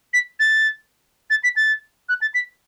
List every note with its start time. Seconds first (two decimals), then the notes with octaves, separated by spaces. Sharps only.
0.14 B6
0.40 A6
1.30 A6
1.44 B6
1.56 A6
2.09 F#6
2.22 A6
2.34 B6